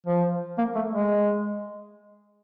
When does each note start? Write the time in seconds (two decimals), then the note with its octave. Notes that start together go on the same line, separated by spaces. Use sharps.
0.06 F3
0.58 A#3
0.75 A3
0.92 G#3